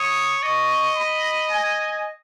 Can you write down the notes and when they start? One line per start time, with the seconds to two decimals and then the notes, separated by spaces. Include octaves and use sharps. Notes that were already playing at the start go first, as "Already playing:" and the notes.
Already playing: C#5 D#6
0.43 D#5 C#6
0.97 B5
1.51 G#5